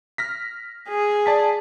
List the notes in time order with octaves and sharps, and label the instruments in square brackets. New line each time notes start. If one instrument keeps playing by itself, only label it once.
[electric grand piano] F6 A#6 B6
[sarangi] G#4
[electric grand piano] D5 A5 B6